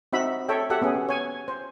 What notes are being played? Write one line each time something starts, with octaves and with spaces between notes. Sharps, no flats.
C4 D#4 F#4 E5 B5
A4 C#5 E5 G5
F#4 G4 A4 E5 F#5
B3 C#4 G#4
C#5 G#5
C5